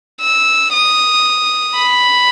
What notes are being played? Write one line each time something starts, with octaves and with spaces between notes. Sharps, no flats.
E6
D#6
B5